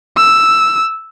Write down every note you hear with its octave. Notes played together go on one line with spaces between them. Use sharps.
E6